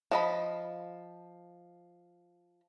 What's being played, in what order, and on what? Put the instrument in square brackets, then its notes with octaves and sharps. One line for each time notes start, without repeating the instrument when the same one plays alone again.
[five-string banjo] F3 D#5 B5